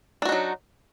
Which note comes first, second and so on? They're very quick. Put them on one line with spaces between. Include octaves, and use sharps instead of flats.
D4 F#4 D#4 F#3